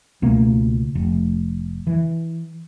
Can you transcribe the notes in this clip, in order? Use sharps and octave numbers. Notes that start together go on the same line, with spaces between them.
C#2 B2 A3 A#3
F1
E3